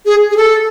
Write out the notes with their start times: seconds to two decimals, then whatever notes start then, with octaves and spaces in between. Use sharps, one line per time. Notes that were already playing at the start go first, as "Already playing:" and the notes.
0.06 G#4
0.31 G#4
0.37 A4